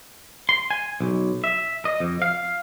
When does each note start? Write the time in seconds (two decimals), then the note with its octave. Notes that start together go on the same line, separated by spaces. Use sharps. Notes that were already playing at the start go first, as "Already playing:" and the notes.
0.49 C6
0.70 G#5
1.01 B1
1.44 E5
1.85 D#5
2.00 F2
2.22 F5